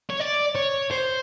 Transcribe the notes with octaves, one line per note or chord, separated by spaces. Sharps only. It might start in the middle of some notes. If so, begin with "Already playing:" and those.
C#5
D5
C#5
C5